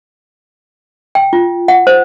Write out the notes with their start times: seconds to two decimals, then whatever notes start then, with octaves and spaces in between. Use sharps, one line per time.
1.15 G5
1.33 F4
1.68 F#5
1.87 C5